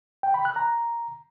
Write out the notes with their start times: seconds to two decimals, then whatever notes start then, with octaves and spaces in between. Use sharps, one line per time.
0.23 G5
0.34 B5
0.45 F#6
0.56 A#5